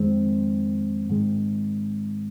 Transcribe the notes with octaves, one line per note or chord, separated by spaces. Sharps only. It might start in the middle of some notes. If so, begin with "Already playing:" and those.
Already playing: F2 D#3 G#3 C4
G#2 D#3 G#3